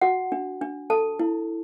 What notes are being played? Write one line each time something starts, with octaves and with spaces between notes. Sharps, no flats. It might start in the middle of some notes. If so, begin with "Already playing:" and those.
F#4 F#5
D4
D4
A4 A5
E4